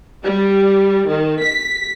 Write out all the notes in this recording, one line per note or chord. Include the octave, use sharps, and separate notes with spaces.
G3
D#3
B6